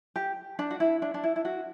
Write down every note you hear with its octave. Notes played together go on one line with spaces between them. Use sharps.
G4
D4
F#4
E4
D4
D4
E4
E4
F#4